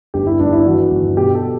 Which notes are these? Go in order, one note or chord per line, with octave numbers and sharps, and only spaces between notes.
G1 G4
E4
G1 D4
E4
E3 F#4
G1
B2 G4
A4